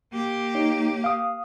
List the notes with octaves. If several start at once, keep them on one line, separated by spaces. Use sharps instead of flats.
A#3 G4
D#4 C#5
F5 D#6